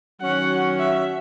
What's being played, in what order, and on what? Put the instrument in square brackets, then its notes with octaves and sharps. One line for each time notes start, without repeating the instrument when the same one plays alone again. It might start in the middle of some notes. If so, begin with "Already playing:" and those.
[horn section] D#3 F#3 C#4 F#4 [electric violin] F#5
[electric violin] E5